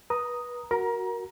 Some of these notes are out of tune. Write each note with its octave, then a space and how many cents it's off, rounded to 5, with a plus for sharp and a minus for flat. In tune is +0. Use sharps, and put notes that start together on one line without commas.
B4 -25 A#5 +0 D#6 +0
F#4 +0 A#4 +0 A#5 +25